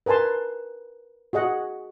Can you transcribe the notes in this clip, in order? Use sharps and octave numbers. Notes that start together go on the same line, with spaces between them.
A#4 B4 G#5 A5 C6
F#4 G#4 D#5 F#5